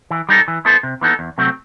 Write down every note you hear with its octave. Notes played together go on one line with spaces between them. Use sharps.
E3
G3 D#4 A4
E3
B3 E4 A4 C5
C3
E3 B3 D#4 A4
E2
C3 F#3 A3 C4